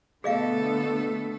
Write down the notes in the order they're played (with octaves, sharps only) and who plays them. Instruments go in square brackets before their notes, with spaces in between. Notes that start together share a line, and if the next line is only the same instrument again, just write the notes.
[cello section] B2 D3 B3 [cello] A3 A4 [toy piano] G#4 D#5 F5